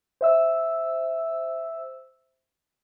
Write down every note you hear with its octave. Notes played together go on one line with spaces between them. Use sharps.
C5 E5 E6